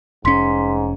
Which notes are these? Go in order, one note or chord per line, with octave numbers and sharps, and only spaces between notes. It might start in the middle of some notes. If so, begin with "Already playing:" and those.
F1 G#2 C#4 C6 B6